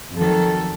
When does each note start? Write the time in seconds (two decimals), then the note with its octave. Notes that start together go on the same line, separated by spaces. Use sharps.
0.16 F2 D#3 F#3 A4